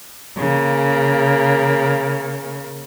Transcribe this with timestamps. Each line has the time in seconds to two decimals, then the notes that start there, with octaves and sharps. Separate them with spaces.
0.38 C#3 A#3